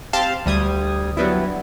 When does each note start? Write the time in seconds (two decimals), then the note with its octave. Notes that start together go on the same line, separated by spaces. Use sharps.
0.13 C4 G4 F5 A5 C6
0.46 D2 G3 D#6 G#6
1.17 F#3 G3 B3 D4 E4